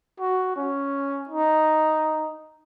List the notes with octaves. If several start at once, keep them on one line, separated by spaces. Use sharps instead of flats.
F#4
C#4
D#4